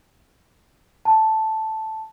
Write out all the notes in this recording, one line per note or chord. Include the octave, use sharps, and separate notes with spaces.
A5